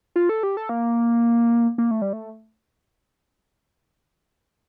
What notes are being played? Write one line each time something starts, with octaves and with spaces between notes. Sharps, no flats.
F4
A4
G4
A4
A#3
A#3
A3
G3
A3